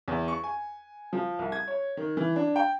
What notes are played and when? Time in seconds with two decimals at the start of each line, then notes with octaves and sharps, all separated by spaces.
0.08 E2
0.28 C#6
0.44 G#5
1.13 F3
1.39 C2
1.52 G#6
1.68 C#5
1.97 D#3
2.17 E3
2.36 D4
2.56 G5